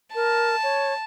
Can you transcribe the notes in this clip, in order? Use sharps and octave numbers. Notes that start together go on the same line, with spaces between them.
A#4 A5
C#5